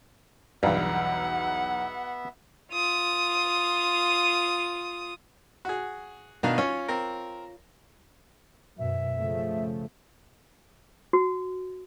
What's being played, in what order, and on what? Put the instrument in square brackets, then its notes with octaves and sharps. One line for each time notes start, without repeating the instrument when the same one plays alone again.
[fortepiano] B1 E2 [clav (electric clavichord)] G2 [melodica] B3 E5 [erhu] F#5
[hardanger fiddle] F4 D#6
[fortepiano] F#4 G#4
[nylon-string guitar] B2 F5 [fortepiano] D#3 D4 D#4
[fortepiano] C#4 [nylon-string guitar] F4 C#5
[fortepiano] C4 A#4
[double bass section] F#2 B2 [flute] E5
[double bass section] C#3 F3 A3
[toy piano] F#4